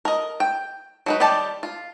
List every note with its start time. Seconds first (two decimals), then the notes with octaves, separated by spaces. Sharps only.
0.05 A#4 D#5
0.40 G5
1.06 F#3 D#4 B4
1.20 D#3 G3 G4 D5 A5
1.63 F4